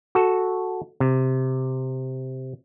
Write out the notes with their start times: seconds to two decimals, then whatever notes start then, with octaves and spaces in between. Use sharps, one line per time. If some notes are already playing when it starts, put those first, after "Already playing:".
0.15 F#4 A4
1.00 C3